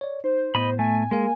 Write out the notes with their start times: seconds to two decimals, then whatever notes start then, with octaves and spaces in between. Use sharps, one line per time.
0.01 C#5 D5
0.24 D#4 C5
0.55 A2 B3 D#5 B5
0.79 A3 G#5
1.11 G#3 A#3 A#4 F5